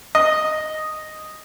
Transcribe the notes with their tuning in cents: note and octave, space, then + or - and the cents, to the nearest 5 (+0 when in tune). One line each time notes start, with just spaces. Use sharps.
D#5 -5